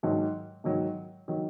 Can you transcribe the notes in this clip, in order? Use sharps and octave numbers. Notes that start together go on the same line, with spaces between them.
G#2 D#3 F#3
G#2 D#3 F#3
D#3 F#3